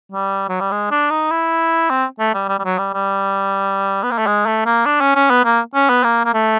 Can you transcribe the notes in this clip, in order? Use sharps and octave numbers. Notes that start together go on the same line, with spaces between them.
G3
F#3
G3
G#3
D4
D#4
E4
C4
A3
G3
G3
G3
F#3
G3
G3
B3
A#3
A3
G#3
A3
A#3
D4
C#4
C#4
B3
A#3
C#4
B3
A#3
A#3
A3